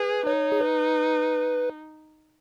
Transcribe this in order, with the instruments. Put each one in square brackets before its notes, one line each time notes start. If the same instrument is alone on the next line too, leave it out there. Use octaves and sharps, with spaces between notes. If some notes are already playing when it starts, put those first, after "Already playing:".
Already playing: [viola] G#4 [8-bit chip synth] B4
[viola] D#4 [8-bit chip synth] C#5
[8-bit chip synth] G#4
B4